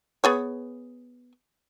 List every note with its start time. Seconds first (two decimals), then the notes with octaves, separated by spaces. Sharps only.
0.24 B3 G#4 C#5